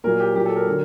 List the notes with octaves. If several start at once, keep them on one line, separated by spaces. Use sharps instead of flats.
A#2 F#3 A#4
G4
A#2 F#3 G4
A4
A#4
D3 F#3